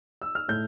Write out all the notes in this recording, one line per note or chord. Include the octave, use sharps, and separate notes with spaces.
E6
F6
A2 G6